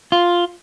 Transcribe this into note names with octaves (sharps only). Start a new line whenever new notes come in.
F4